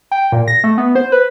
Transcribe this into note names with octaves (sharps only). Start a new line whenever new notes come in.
G5
A#2
A#6
A3
B3
C5
B4